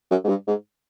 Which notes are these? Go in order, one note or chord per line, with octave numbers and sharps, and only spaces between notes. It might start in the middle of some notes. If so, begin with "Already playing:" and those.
F#2
G#2
G2
G#2